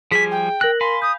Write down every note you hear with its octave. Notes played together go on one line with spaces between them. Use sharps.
F3 G3 G#4 G#5 B6
G5
A#4 F#6 A#6 F#7
F5 G#5 B5 C6
D#6 G6